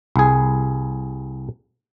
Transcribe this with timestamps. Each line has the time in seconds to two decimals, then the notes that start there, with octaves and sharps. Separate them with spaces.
0.16 C2 G#4